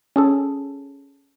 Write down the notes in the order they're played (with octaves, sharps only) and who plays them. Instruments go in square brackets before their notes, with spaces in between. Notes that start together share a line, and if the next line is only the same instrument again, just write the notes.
[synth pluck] C#4 G#4 A4